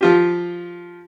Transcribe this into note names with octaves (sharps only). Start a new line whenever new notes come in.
F3 F4 G4